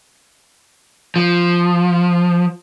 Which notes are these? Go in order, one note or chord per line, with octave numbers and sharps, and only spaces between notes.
F3